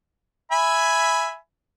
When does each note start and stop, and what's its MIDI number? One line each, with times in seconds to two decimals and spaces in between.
0.52 1.36 76
0.52 1.36 80
0.52 1.36 83